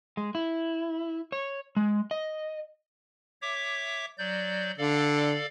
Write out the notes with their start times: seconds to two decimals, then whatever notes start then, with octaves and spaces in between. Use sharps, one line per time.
0.17 G#3
0.35 E4
1.32 C#5
1.77 G#3
2.11 D#5
3.41 C#5 E5 D6
4.18 F#3 D5 G6
4.78 D3 A4 D5 F5